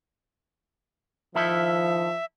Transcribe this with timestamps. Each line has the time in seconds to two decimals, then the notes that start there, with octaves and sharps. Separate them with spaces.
1.35 D#3 F3 E4 A4 E5